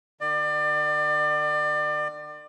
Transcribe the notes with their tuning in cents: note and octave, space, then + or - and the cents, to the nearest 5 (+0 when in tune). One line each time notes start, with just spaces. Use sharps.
D#3 -45 D5 +30